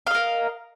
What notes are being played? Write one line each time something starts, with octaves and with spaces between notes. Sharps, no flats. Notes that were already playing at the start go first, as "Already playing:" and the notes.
A#4 D#5 F5